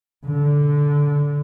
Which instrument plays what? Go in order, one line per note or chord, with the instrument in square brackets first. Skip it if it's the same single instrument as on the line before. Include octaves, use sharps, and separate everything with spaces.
[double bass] D3